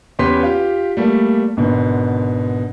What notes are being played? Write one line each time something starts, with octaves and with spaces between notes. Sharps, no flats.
E2 C#4 G4 B4 C6 B6
F4 G4
G3 A3 A#3
G#1 B2 D3